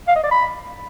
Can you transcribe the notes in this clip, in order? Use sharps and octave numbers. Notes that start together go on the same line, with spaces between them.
F5
D#5
D5
B5